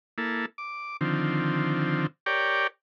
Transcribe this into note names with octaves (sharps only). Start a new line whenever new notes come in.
A#3 E4 A4
D6
D3 D#3 F3 C4
G4 A#4 C#5 D5 G5